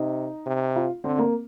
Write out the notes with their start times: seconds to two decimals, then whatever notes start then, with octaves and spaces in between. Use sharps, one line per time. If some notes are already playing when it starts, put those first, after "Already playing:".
Already playing: C3 D#4
0.46 C3
0.76 F4
1.04 D3 C4
1.18 A#3